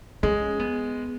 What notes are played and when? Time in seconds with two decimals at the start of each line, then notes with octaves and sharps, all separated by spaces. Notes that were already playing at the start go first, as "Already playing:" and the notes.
0.23 G#3 C#4
0.60 B3